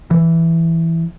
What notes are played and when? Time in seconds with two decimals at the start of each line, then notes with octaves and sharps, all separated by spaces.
0.11 E3